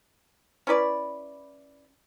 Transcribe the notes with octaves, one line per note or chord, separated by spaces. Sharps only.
C#4 E4 B4 D5